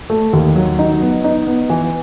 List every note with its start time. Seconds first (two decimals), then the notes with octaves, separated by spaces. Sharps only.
0.10 A3
0.33 D#2
0.55 F#3
0.79 D#4
1.01 B3
1.24 D#4
1.47 B3
1.70 E3